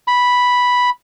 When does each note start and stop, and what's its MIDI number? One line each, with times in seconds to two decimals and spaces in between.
0.07 0.90 83